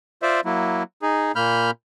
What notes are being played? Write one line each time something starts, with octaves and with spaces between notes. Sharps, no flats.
F4 C5 D5 E5
F#3 A#3 E4
D#4 G#4
A#2 A#3 B5 F6 G6